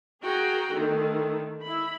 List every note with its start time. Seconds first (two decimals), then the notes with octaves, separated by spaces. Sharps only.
0.22 F#4 G#4 A#4 G5 A#5
0.71 D3 D#3 A3
1.63 E4 B5